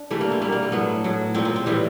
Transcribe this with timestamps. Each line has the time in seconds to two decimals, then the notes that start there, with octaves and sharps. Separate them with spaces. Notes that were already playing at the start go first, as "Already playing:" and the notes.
Already playing: D4
0.11 C3 E3 G3 A3
0.21 A#3
0.32 C4
0.42 B2 G3 A#3
0.52 A#3
0.63 A3
0.72 A2 F#3 B3
1.04 A2 F#3
1.35 A#2 F3 C4
1.45 C4
1.56 C4
1.66 A2 E3 G3 C4